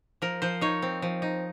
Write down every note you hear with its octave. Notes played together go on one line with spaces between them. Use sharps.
F3 A#4
F3 C5
D#4 C#5
C4
F3
D#4